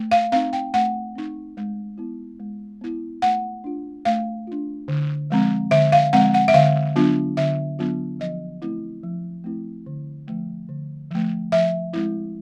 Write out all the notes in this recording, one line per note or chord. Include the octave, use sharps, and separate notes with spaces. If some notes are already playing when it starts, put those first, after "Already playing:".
Already playing: A3
F5
C4 D#4 F5
G5
A3 F#5
C4 D#4
G#3
B3 E4
G#3
B3 E4
A3 F#5
D4 F4
A3 F5
D4 F4
D3
F3 G#3 C4
D3 E5
F5
F3 G#3 C4 F#5
F#5
E5
D3 F5
F#3 B3 D4 F4
D3 E5
F#3 B3 D4 F4
F3 D#5
A3 C4 E4
F3
A3 C4 E4
D3
F3 A3
D3
F3 A3
F3 E5
G#3 C4 E4